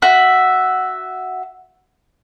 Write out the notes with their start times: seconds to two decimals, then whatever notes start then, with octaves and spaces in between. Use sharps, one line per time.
0.02 F#4 E5